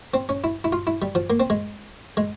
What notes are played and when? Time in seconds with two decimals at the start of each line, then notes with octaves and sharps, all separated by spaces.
0.14 C4
0.29 C#4
0.44 E4
0.64 E4
0.72 F4
0.87 E4
1.02 G3
1.15 F3
1.30 A#3
1.40 C4
1.50 G#3
2.17 G#3